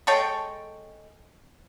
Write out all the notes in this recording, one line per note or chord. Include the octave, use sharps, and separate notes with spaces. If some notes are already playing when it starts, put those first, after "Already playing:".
G#3 A4 C#5 G5